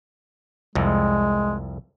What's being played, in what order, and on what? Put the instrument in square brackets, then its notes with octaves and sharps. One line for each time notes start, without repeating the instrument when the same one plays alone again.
[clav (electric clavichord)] C2 F2 [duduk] G#3